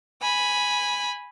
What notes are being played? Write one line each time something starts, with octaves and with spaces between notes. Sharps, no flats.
G#5 B5